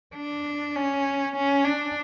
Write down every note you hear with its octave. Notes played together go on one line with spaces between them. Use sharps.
D4
C#4
C#4
D4